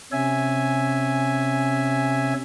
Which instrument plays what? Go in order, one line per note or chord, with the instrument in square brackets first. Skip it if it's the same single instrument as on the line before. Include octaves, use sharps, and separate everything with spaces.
[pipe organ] C3 C#4 E5 G#5